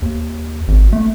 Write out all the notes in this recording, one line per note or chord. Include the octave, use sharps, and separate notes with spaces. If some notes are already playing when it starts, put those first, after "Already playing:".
D#2
G#1
A3